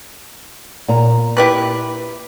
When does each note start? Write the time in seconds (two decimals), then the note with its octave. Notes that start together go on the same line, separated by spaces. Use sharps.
0.88 A#2 A#5
1.37 E4 G4 B4